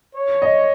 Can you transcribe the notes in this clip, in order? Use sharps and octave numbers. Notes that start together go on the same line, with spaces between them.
C#5
D#5